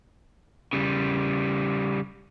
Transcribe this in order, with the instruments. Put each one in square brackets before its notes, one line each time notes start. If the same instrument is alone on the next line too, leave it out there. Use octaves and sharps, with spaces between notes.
[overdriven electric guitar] C#3 G3